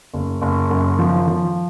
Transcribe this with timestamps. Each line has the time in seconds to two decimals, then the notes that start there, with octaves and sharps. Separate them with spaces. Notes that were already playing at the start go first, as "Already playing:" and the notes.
0.14 F#1
0.42 F#1
0.70 F#2
0.99 F3
1.27 F3